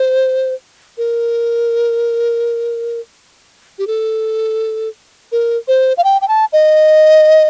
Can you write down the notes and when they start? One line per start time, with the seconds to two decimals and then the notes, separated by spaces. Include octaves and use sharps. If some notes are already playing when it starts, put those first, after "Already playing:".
Already playing: C5
0.98 A#4
3.79 G4
3.87 A4
5.32 A#4
5.68 C5
5.97 F5
6.04 G5
6.22 G5
6.28 A5
6.53 D#5